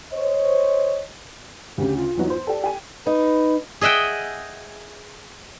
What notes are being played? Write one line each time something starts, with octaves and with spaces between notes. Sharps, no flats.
C5 C#5 D#5
D2 C#3 G4
F4
E2 F#3 D#4
C5
G4 A4 D5
G4 G#5
D#4 B4
G#4 D#5 E5 F#5 G5